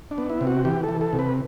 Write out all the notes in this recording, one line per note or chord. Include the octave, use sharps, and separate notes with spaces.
D4
B3
E4
C3
F#4
E3 G4
A4
E3
A4
C3
B4